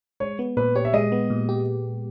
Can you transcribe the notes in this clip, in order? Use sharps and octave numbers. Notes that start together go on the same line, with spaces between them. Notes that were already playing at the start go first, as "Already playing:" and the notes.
G#3 C#5
B3
A#2 B4
G4 C#5
E5
G#3 D#5
B3
A#2
G4